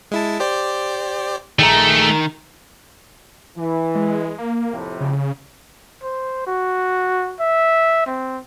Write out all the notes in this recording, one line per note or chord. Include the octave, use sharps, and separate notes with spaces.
G#3 E4 A5
G4 C5 D5
A#1 D#3 A3 G#4 A#5
E3
G#3
A#3
F2 A2 C3
C#3
C5
F#4
E5
C4